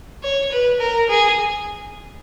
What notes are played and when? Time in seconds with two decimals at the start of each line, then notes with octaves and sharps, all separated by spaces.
0.23 C#5
0.51 B4
0.80 A#4
1.09 G#4